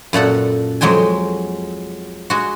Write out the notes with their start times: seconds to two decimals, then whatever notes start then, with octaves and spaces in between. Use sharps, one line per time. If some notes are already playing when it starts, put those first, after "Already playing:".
0.13 F#2 A#2 A4 F#5
0.81 F2 F#3 G#3 G5 G#5
2.30 G#3 F#4